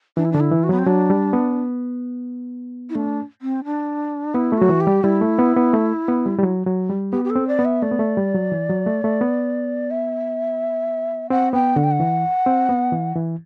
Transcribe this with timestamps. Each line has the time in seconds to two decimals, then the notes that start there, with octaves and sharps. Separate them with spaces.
0.17 E3 D4
0.25 E4
0.32 D3 D4
0.40 E4
0.52 E3
0.63 F#4
0.69 F#3 B3
0.79 C4
0.87 F#3 D4
1.10 G3
1.33 B3
2.90 E4
2.95 A3 D4
3.42 C4
3.65 D4
4.34 B3 E4
4.52 A3
4.58 F#3 F#4
4.69 E3
4.81 G4
4.87 G3
5.04 G3 E4
5.21 A3
5.39 B3
5.56 B3
5.74 A3
6.08 B3
6.26 G3
6.38 G3
6.43 F#3
6.66 F#3
6.90 G3
7.13 B3 G4
7.25 G4
7.30 A4
7.36 C4
7.48 D5
7.59 B3
7.65 E5
7.82 A3 D5
7.91 B3
7.99 A3
8.17 G3
8.34 F#3
8.52 E3
8.69 F#3
8.86 A3
9.04 A3
9.21 B3
9.91 E5
11.30 C4 F#5
11.53 B3 G5
11.76 D3 F#5
11.84 G5
11.91 F#5
12.00 E3
12.46 C4
12.69 B3
12.92 E3
13.16 E3